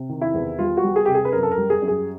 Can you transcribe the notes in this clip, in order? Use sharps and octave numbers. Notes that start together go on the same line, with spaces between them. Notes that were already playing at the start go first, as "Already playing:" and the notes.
Already playing: C3
D#3
E4
E2
G3 F4
F#4
G3
G#4
C3 G4
G#4
B4
F#2 A#4
A4
A#4
G3
G#4
F#2
G#4